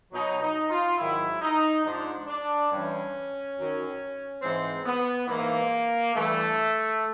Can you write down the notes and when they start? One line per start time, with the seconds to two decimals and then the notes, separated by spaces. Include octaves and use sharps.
0.13 B2 F#3 D#4
0.41 D#4
0.70 F4
0.98 G#2 D#3 F#3 E4
1.41 D#4
1.84 G#2 F3 D4
2.27 D4
2.71 G2 E3 C#4
3.56 F#2 D#3 F#3
4.42 G#2 E3 C4
4.85 B3
5.28 G#2 E3 A#3
6.14 G2 E3 A3